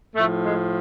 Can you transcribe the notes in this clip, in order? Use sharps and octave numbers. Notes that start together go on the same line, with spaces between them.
A2 F3 A3
G#3